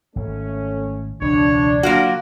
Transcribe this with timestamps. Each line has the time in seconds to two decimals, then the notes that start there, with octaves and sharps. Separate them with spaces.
0.16 G#1 A3 C#4
1.21 E1 C#2 D4 C#5
1.83 D3 F#3 A#3 F4 F#4 A#4